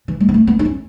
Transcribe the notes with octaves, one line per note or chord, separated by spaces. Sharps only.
E3
G#3
B3
A3
B3
D#4
C#4